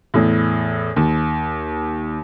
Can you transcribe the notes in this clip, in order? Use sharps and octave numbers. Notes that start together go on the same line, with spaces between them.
E2 A2
D#2